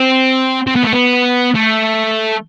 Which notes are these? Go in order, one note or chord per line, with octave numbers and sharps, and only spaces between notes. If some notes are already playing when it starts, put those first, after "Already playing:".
Already playing: C4
C4
B3
A3
B3
A3